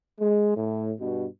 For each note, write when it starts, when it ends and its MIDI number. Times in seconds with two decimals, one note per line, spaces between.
0.20 0.53 56
0.56 0.92 45
1.00 1.26 43
1.00 1.26 47